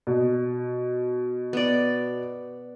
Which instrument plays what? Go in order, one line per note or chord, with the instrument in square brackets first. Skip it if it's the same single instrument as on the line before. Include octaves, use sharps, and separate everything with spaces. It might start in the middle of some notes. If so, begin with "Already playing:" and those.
[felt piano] B2
[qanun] B3 D5